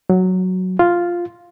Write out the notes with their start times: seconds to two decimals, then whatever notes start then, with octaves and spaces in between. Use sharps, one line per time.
0.10 F#3
0.79 F4